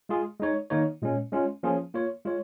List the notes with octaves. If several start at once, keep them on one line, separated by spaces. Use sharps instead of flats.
G#3 F4 G#4
G#3 D#4 C#5
D#3 A#3 D#4 C#5
A#2 G#3 C#4
G#3 C#4 F4
F3 A#3 C#4 F4 G#4
A#3 F4 C#5
G#3 F4 C#5